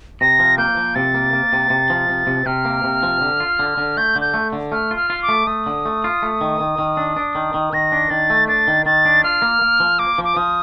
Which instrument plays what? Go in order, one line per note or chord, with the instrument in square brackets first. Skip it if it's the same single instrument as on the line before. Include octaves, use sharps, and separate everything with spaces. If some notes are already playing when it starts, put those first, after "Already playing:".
[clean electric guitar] C3 [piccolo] A#6
[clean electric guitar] F3
[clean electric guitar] A#3 [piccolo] G6
[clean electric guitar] F3
[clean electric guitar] C3 [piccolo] A6
[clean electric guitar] A#3
A#3
C3
C3
F3
C3
C3
[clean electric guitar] C3 [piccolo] F6
[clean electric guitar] A#3
C3
F3
D3
F4
D3
D3
[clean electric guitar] A3 [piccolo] G6
[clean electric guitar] D3
[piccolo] G6
[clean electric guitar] A3
D3
[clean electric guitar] A3 [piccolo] F6
[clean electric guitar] F4
[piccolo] F6
[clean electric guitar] F4
[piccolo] D6
[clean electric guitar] A3
[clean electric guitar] A3 [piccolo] D#6
[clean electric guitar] D3
A3
F4
A3
D#3
D#3
D#3
D4
D4
D#3
D#3
[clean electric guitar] D#3 [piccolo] A#6
[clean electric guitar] D4
[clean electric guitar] D#3 [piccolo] A6
[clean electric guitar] A3
[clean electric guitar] D4 [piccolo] A6
[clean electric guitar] D#3
[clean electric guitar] D#3 [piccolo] A6
[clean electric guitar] D4
[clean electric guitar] F4 [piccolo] F6
[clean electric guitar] A#3
A#3
F3
[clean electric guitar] A#3 [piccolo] D6
[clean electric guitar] F3
[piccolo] D6
[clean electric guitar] F3 [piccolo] D#6